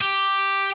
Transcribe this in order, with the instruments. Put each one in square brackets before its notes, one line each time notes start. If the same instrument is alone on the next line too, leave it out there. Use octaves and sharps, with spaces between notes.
[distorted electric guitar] G4